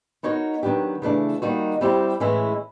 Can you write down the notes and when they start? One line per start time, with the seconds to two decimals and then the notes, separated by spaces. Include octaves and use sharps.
0.23 B3 D#4 F#4 A#4 C#5
0.63 D#3 F#3 B3 D4 G4
1.02 C#3 E3 A3 D4
1.42 D#3 G3 A#3 D#4 F#4
1.81 G3 C4 E4 G4
2.20 A2 E3 G#3 C#4 E4